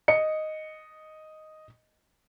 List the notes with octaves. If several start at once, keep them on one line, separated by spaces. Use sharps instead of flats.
D#5 C#7